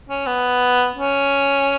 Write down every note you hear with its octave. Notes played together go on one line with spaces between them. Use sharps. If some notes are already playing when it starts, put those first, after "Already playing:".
C#4
B3
C#4